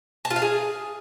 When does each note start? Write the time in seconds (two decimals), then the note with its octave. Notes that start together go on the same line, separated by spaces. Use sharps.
0.25 A5
0.30 F4
0.36 F5
0.42 G#4